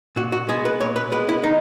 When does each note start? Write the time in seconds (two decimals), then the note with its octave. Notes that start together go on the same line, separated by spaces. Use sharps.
0.16 A#2 F#4
0.32 F#4
0.49 G#3 B3 G#4
0.65 B4
0.80 A#2 C#5
0.96 B4
1.12 G#3 B3 B4
1.29 E4
1.44 D#3 D#4